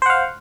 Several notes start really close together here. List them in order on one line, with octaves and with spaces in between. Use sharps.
C5 F#5 F5